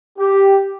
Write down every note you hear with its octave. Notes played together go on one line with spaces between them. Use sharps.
G4